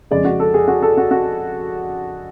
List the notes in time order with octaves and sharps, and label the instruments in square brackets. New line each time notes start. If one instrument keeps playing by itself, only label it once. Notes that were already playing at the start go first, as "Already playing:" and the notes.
[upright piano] F2 C#3 G#3 D5
F#4
A4
G#4
F#4
A4
F#4
F#4